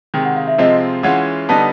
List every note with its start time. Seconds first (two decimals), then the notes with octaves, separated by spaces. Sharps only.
0.14 C3 D#3 G#3 G5
0.25 F#5
0.36 F5
0.48 E5
0.58 C3 F3 G#3 C4 F4 D#5
1.03 E3 G#3 C#4 F4 F#5
1.49 D3 G3 B3 D#4 A5